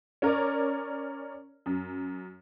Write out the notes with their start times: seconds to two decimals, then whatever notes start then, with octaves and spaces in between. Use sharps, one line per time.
0.22 C#4 A#4 C#5 D5
1.66 F#2